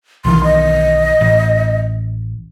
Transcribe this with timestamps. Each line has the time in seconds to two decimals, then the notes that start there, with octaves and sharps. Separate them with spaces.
0.25 B1 D#3 E3 C6
0.44 D#5
1.21 A1